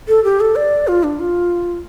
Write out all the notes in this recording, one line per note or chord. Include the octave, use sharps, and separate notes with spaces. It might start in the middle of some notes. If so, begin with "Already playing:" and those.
A4
G4
A4
D5
F4
D4
F4